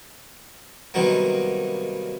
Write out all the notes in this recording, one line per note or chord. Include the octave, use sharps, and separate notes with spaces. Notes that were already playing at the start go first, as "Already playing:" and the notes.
C2 B2 D#3 F#3 A#3